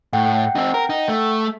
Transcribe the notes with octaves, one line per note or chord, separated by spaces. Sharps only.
A2 F#5 G5
C4 D#4
A#4
D#4
A3